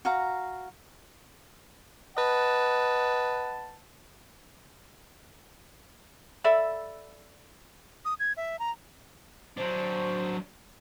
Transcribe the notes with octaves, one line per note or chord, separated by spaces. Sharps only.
F#4 F5 A#5
B4 D#5 F#5 A5
A4 D5 E5 B5
D#6
G#6
E5
A#5
F#3 D4 C5